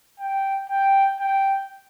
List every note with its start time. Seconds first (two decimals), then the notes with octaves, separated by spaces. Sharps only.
0.20 G5
0.70 G5
1.20 G5